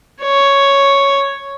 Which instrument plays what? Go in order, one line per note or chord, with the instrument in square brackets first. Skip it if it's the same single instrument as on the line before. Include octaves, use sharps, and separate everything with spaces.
[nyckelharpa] C#5